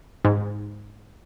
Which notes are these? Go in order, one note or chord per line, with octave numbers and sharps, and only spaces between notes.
G#2